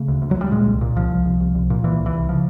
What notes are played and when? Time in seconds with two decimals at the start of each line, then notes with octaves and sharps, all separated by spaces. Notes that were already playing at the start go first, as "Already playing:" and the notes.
Already playing: C#3 A3
0.08 D2
0.22 D2
0.31 F#3
0.37 D2 G3
0.51 A#2 G#3
0.67 C2
0.81 A#2
0.96 C2 F3
1.10 C2
1.25 C2
1.40 C2
1.55 C2
1.70 A#2
1.84 A#2 E3
1.99 C2
2.06 E3
2.14 C2
2.29 C#3 F3